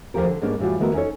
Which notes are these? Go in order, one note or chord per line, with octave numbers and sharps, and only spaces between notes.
D2 A#2 F3 G4 A#4
D3
G#2 G3 A#3 B3 C#4 D4
A2 E3 G3 F4 F#4
D#3 A3 B3 F#4 A#4
C#4 D#4 A4 C#5